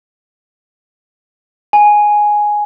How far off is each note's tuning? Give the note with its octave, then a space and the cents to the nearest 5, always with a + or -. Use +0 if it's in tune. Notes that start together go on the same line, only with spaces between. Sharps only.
G#5 +5